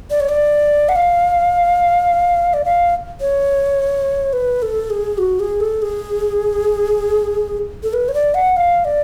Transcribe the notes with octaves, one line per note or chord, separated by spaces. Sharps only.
D5
C#5
D5
F#5
F5
D5
F5
C#5
B4
A4
G#4
F#4
G#4
A4
G#4
A4
B4
C#5
D5
F#5
F5
D5